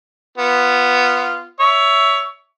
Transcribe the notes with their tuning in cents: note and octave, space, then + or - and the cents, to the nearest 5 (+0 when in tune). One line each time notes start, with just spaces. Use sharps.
B3 +0 F4 -15
C#5 +20 E5 +0